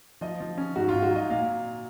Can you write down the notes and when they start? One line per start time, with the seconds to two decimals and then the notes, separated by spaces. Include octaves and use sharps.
0.21 F3 D#5
0.40 F3
0.58 C#4
0.76 G#2 F#4
0.89 F4
0.94 G#2
1.02 F#4
1.11 F#3
1.16 D#5
1.30 A#2 F5